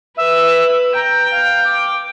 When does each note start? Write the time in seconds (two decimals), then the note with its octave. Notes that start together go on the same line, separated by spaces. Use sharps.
0.17 B4 E5
0.95 G5 A#5
1.31 F5
1.65 D6